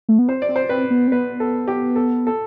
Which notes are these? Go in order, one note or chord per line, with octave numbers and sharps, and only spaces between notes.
A3
B3
C4 C5
D5
C4
C5
C4 B4
B3
C4
B3 B4
A4
G4
A4
A4